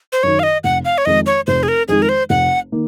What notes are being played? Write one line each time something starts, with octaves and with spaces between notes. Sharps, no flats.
C5
F#2 D#3 C#5
F5
D#5
F1 F#5
F5
C#5
F2 D#3 G#3 D#4 D#5
C#5
F1 C5
G#4
A#4
F2 D#3 G#3 D#4 G#4
A#4
C5
F1 F#5
D#3 A#3